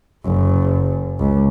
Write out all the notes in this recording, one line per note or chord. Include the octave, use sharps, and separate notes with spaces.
F#1
C#2